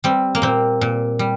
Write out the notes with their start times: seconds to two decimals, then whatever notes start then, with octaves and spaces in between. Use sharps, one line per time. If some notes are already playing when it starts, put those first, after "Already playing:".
0.04 G3 C4
0.35 A#3
0.42 A#2 C4
0.81 A#2
1.19 G3